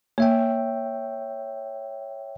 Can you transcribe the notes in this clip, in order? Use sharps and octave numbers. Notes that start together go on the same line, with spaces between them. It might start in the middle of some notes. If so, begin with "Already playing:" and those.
A#3 C#5 E5 G5